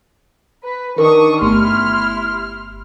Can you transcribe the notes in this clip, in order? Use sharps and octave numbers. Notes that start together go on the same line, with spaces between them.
B4
D#3 D4 A#4 C#6 D#6
G1 A3 B3 E4 G4 C6 F6